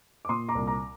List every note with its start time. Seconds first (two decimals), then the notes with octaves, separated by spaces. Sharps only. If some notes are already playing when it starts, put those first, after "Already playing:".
0.25 D6
0.29 A#2 C6 D#6
0.49 A#5 D6
0.55 C2
0.67 A#5 D6